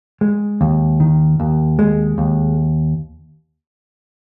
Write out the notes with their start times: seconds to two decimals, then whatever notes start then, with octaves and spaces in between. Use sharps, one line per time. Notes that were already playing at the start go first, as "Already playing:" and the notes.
0.21 G#3
0.61 D#2
1.00 D#3
1.40 D#2
1.79 G#3
2.18 D#2